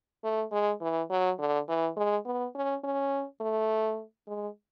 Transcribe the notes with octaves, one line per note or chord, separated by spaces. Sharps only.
A3
G#3
E3
F#3
D3
E3
G#3
B3
C#4
C#4
A3
G#3